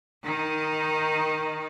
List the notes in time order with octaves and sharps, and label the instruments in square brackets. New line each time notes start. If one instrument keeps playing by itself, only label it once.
[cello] D#3 D#4